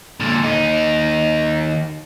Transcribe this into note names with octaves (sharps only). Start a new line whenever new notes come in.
A#2 D3
D#2 D#4